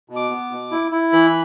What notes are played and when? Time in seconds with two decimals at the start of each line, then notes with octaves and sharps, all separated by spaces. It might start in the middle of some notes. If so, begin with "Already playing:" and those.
0.09 B2
0.16 D6
0.30 B3
0.51 B2
0.71 E4
0.92 E4
1.13 E3 B5